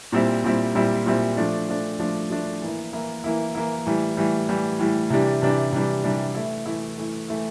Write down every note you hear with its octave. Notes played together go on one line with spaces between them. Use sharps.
A#2 G3 C4 E4
A#2 G3 C4 E4
A#2 G3 C4 E4
A#2 G3 C4 E4
F3 A3 D4
F3 A3 D4
F3 A3 D4
F3 A3 D4
E3 A#3 E4
E3 A#3 E4
E3 A#3 E4
E3 A#3 E4
A2 E3 G3
A2 E3 G3
A2 E3 G3
A2 E3 G3
C3 E3 G3 D4
C3 E3 G3 D4
C3 E3 G3 D4
C3 E3 G3 D4
E3 A3 E4
E3 A3 E4
E3 A3 E4
E3 A3 E4